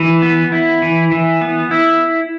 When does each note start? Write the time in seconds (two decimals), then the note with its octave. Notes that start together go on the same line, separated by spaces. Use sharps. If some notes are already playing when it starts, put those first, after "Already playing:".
Already playing: E3
0.22 B3
0.52 E4
0.82 E3
1.12 E3
1.41 B3
1.71 E4